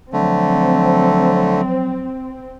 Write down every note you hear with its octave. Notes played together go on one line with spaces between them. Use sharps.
D3 F3 F#3 A3 C4